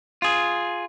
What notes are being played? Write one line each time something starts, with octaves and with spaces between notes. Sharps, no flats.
F4 G#4